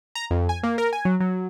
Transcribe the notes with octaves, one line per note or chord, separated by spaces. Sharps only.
A#5
F2
G#5
A#3
A#4
G#5
F#3
F#3